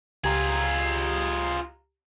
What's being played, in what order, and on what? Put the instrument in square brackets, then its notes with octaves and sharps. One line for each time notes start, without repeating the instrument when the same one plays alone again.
[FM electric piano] C#2 G4 A#5 [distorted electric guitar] F4 G#4